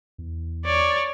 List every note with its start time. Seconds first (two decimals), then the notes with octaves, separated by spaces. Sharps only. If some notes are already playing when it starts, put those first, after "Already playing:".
0.18 E2
0.65 C#5 D5